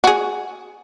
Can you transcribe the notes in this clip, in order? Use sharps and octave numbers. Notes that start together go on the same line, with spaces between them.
F#4 G#4